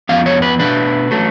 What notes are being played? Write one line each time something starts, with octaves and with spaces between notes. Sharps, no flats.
F2 F3 B3 F5
C#5
B4
B2 A3 D4 B4
F#3 A3